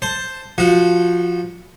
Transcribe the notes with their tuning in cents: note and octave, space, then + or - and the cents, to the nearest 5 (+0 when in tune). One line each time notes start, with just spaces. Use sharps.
C5 +0 A5 +0
F3 +0 F#4 +0 F#5 -35